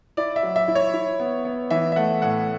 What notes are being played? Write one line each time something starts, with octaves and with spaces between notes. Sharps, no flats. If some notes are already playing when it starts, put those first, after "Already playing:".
E4 D5
E5
F#3
E5
E4
C#5
E4
B3
B3
E3 E5
E5
A3 F#5
A2 F#5